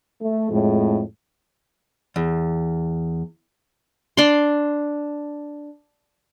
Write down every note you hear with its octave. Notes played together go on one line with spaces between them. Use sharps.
A3
F2 A2 G#3
E2
D4 C6